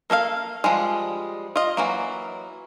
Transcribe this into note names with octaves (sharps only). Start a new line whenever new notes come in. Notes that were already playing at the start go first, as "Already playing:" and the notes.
A#3 A4 A#4 F5
F3 G3 G#3
F4 D#5
E3 F#3 A#3